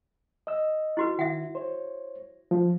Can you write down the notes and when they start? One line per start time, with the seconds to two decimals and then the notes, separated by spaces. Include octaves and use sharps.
0.47 D#5 E6
0.97 E4 F#4 B4
1.19 D#3 E4 E5 F#5
1.55 C5 C#5
2.51 F3